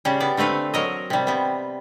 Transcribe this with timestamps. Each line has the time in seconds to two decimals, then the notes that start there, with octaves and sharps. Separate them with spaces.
0.05 C#3 G3
0.20 B3 D5
0.37 D3 A3 C4 B4 F5
0.74 F#3 A#4 D#5
1.10 C3 G3
1.27 C3 B3